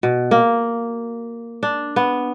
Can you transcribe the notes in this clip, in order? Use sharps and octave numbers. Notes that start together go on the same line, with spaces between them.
B2
A#3
D4
B3